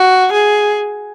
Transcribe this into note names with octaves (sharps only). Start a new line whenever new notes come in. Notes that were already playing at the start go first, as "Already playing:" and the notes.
Already playing: F#4
G#4